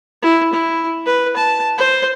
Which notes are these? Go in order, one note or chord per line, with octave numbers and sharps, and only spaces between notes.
E4
E4
B4
A5
C5